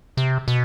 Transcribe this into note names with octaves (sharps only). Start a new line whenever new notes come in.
C3
B2